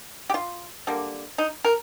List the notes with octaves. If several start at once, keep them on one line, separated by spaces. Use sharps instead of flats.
G4
F4
D3 G3 A#3
D#4
A#4